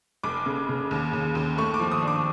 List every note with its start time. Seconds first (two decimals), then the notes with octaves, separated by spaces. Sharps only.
0.23 F1 D6
0.46 C#3
0.69 C#3
0.91 D#2
1.13 D#2
1.35 D#2
1.58 A3 C#6
1.74 D6
1.80 F3
1.91 D#6
2.03 D4 D6